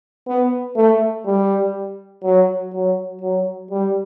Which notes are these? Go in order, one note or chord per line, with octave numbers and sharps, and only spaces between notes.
B3
A3
G3
F#3
F#3
F#3
G3